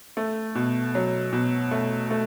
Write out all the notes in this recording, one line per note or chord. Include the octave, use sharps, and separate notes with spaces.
A3
B2
F#3
B2
A3
A3